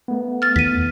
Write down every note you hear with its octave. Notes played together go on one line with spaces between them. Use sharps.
A3 B3
F6 A6
E2 B6 D#7